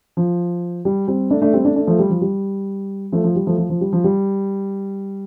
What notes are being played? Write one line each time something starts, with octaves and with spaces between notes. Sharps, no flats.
F3
G3
G3 C4
A3 D4
A3 D4
G3 C4
A3 D4
A3 D4
F3 A3
G3
F3
G3
F3 A3
F3
G3
F3 A3
F3
F3
G3
F3
G3